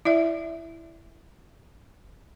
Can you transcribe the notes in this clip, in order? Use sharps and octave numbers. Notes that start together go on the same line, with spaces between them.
E4 D5 E5